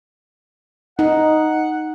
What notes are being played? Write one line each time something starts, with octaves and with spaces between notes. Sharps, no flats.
D#4 F#5